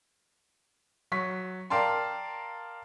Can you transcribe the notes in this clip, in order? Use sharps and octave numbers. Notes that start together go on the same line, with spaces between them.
F#3 C#6 B6
A#4 D5 F5 G5 A5 C6